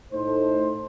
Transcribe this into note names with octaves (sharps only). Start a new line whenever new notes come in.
A2 A3 D#4 A4 C5